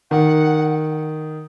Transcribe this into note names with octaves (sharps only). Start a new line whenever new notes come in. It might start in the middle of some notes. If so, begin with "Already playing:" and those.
D#3 F#5